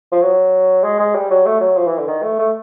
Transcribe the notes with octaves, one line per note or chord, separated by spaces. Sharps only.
F3
F#3
G#3
G#3
G3
F#3
A3
F#3
F3
E3
D3
D#3
A3
A3